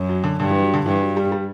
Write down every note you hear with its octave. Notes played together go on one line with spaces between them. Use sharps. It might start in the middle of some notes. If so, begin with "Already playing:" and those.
Already playing: F#2
F#3
D3
G2 D3
E3
F#3
D3
G2 E3
F#3
G3
G3